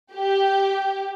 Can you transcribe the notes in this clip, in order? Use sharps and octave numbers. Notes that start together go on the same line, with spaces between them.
G4